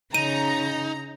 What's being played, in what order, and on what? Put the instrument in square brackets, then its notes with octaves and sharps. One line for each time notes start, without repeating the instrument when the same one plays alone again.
[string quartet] C#3 [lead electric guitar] D#4 [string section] A#5 [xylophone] D#7